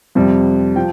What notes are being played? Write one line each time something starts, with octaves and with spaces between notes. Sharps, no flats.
F2 C3 G3
F3 G5